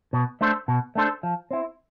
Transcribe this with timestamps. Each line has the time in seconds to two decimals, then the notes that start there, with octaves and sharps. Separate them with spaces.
0.13 B2
0.41 A3 D4 A4 C5
0.68 B2
0.95 A3 D4 A4 C5
1.23 F3
1.51 C4 E4